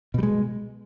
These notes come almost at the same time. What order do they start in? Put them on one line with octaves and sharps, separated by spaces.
B2 G3 G#3